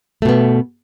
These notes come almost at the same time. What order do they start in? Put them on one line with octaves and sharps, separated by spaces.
A3 B2 B3